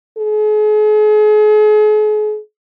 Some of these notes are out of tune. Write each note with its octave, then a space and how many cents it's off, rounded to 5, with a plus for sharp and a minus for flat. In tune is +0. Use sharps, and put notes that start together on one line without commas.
G#4 +40